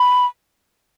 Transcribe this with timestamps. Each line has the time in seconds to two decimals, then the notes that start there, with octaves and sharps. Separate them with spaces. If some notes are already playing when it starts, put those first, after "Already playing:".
Already playing: B5